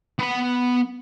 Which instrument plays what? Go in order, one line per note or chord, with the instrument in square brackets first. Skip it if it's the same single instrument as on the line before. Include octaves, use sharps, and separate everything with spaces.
[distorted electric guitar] B3 B5